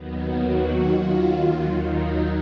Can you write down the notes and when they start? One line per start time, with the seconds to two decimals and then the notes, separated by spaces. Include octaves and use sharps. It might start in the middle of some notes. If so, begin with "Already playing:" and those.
Already playing: D#2 D#3 F#3 B3
0.36 F#4
0.81 F4
1.70 D#2 D#3 F#3 D#4